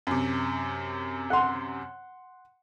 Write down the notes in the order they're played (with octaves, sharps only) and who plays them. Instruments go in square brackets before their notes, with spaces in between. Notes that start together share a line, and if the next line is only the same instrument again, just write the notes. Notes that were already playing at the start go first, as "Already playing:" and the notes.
[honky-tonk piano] F#2 C3
[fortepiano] F#5 C6